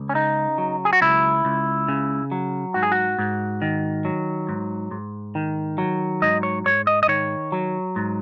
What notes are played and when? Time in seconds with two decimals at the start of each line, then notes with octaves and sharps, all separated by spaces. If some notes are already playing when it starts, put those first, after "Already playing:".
Already playing: C#2
0.09 C#4
0.14 C#3 D#4
0.58 F#3
0.85 G#4
0.93 F#4
1.01 C#2 E4
1.45 C#2
1.88 C#3
2.31 F#3
2.74 G#2 F#4
2.83 G#4
2.92 F#4
3.19 G#2
3.62 D#3
4.05 F#3
4.49 G#2
4.91 G#2
5.35 D#3
5.78 F#3
6.22 G#2 D#5
6.43 C#5
6.65 G#2 C#5
6.87 D#5
7.03 D#5
7.08 D#3 C#5
7.52 F#3
7.96 G#2